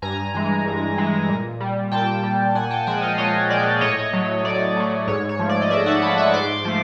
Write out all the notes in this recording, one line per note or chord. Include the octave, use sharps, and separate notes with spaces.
G2 G#5 A#5
E3 G#3
G2
E3 G#3
A#2
G3
A#2 G5 A5
G3
A#2 F#5 G#5
G5 A5
F3 G#3 F#5 G#5
D#5 F5
A#2 C#5 D#5
F3 G#3 D5
A2 C#5 D#5
F#3 A3
A2 D5
F#3 A3
G#2 C#5
C#5
F3 A3
D5
D#5
G#2 D5 E5
E5 F#5
F3 A3 A5 B5
B5 C#6
G#2 C6 D6
F3 A3